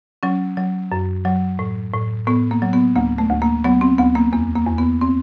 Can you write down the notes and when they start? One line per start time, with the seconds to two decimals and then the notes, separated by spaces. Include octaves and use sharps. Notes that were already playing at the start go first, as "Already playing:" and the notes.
0.23 F#3 C#4
0.57 F#3
0.92 F#2
1.25 F#3
1.59 A2
1.94 A2
2.27 A2 B3
2.51 A#3
2.62 F#3
2.73 B3
2.96 D2 A#3
3.18 A3
3.30 D2
3.42 A#3
3.64 F#3 B3
3.81 C4
3.98 D2 B3
4.15 A#3
4.33 E2 A#3
4.55 A#3
4.67 E2
4.78 B3
5.01 C4